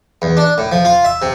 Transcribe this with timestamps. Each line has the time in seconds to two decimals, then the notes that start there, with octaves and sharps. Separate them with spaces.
0.22 E2
0.37 D4
0.58 A2
0.72 F3
0.85 F4
1.05 E5
1.22 C3